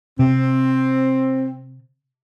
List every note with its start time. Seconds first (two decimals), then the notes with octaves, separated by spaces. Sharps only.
0.19 C3 C4